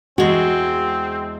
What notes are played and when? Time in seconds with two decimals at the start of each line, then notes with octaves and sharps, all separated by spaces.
0.18 E2 G#3 C4 F#4